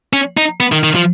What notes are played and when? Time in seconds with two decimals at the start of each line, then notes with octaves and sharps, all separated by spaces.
0.13 C#4
0.37 D#4
0.60 B3
0.72 D#3
0.84 D#3
0.95 F3